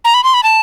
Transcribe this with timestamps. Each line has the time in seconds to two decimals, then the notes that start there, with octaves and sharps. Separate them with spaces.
0.05 A#5
0.14 B5
0.24 C6
0.34 B5
0.43 A5